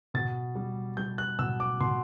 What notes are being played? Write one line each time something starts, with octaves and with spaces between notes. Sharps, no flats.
B2 A6
G3
G3 G6
F#6
B2 E6
D6
B2 C6